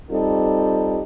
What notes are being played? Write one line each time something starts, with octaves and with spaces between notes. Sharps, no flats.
G3 C4 D#4 F4 G4 A4